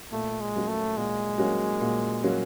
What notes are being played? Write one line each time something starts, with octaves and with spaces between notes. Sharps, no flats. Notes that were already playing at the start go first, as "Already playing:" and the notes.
A#2 A3
G#3
F#3 A#3 C#4 F#4
A3
A#2 G#3
F#3 A#3 C#4 F#4
A#2
F#3 A#3 C#4 F#4